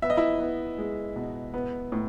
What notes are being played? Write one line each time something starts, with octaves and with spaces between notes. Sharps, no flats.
B3 E5
D#5
E4 E5
B3
G#3
B2
B3
A2